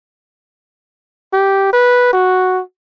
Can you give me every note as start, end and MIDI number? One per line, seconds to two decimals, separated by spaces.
1.34 1.69 67
1.73 2.11 71
2.13 2.62 66